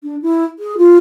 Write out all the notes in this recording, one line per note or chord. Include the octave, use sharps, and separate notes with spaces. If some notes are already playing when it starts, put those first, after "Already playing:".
D4
E4
G#4
F4